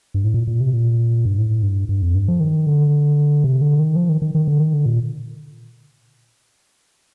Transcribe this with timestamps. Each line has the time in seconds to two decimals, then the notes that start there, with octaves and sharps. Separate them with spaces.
0.14 G2
0.24 A2
0.34 A#2
0.47 A#2
0.61 C3
0.73 A#2
1.25 G2
1.38 A2
1.63 G2
1.89 G2
2.02 F2
2.15 G2
2.28 F3
2.40 D#3
2.67 D3
3.44 C3
3.61 D3
3.79 D#3
3.96 F3
4.09 D#3
4.22 D#3
4.35 D#3
4.48 D3
4.60 D#3
4.73 D3
4.86 A#2